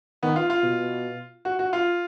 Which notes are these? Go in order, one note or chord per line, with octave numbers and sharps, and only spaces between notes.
D#3 B3
F4
F4
B2
F#4
F#4
F4